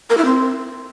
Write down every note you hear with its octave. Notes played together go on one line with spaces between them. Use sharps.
A#4
E4
C4